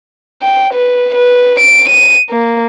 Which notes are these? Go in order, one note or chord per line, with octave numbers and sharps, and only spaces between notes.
G5
B4
B4
D7
D#7
A#3